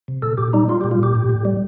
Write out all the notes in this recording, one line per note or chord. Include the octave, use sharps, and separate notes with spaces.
C3
A#2 A4
A#2 G4
G3 D#4
G3 F4
G4
A#2
F4
A#2 G4
A2
A2
G3